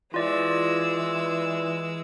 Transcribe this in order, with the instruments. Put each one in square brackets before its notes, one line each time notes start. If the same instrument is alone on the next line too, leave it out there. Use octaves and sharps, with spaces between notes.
[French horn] E3 [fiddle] G#3 E6 [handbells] F4 D5